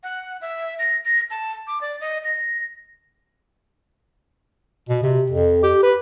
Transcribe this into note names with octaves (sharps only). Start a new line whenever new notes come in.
F#5
E5
A#6
A#6
A5
D6
D5
D#5
A#6
B2
C3
F2
G4
B4